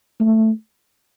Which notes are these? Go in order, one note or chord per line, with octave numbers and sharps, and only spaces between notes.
A3